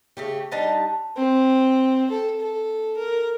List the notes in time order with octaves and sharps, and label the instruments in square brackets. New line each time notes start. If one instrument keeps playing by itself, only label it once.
[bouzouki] C#3 A3 G4
G3 D4 D#4 A5
[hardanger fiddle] C4
A4
A4
A#4